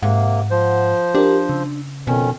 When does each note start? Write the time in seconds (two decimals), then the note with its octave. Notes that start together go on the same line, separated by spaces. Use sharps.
0.03 G#2 C3 A#3 F#5
0.50 F3 C5
1.15 D4 G4 A#4
1.49 C#3
2.07 F2 B2 D#3 C#4